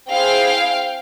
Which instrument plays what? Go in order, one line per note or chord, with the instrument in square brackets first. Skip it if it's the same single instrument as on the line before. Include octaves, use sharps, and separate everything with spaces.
[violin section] C4 E4 G#4 F5 G5